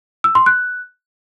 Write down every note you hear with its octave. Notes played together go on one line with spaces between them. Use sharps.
E6
C6
F#6